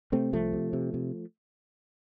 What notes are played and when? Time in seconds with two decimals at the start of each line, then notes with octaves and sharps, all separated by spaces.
0.12 C3 A3 C4
0.33 C2 F3 A3
0.53 C3
0.73 C3
0.94 C3